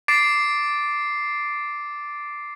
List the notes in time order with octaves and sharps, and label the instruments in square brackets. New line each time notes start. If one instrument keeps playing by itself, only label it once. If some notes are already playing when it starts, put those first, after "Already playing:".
[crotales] D6 A6 C7 D7